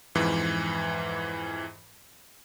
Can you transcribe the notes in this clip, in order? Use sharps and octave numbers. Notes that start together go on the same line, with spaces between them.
F2 G#2 E3